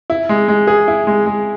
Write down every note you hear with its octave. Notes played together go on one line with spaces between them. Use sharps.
E4
G#3
G#3
G#4
E4
G#3
G#3